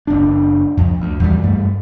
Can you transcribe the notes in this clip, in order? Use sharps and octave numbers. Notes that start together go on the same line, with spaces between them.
F#1 D4
F2
D2
E2 F#3 G3
G2 A3